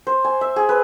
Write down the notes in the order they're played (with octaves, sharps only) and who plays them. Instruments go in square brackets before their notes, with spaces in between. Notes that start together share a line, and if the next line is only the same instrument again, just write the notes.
[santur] C5
G#5
E5
G#4
B4